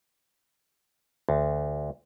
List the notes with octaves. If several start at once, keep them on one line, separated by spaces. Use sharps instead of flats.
D2